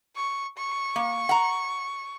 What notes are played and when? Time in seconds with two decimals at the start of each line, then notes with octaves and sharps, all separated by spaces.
0.16 C#6
0.57 C#6
0.96 A#3
1.29 F#5 A#5